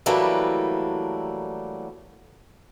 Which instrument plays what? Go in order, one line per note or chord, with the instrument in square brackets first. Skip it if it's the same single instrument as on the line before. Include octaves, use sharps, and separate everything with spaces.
[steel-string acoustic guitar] E3 F#3 G3 A3 A#3 D4